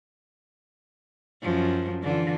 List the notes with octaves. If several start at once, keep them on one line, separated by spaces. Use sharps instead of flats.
F#2 F3
D3 E3 F4